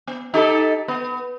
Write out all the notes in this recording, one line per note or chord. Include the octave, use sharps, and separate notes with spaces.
B3
D#4 G4 A4
B3